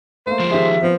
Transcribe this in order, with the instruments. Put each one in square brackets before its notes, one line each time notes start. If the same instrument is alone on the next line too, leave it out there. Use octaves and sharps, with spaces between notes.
[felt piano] A3 A#3 [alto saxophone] C5
[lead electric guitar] F3 G#3 [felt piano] D7 E7
[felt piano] D#3 G4 G#4 [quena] E5
[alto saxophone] F3 [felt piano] B3 C4